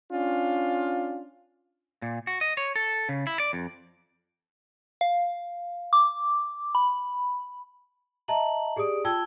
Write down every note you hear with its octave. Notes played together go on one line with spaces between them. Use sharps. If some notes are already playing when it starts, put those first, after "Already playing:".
C#4 D4 F4
A#2
F#4
D#5
C#5
A4
C#3
E4
D5
F2
F5
D6
B5
D#5 E5 A5 A#5 F#7
G4 G#4 D5 D#6 D7
F4 G5 A5 E6 G#6 G7